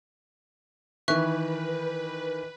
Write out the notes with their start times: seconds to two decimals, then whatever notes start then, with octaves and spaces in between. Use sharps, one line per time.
1.08 D#3 E3 B4 E5 C#6 F#6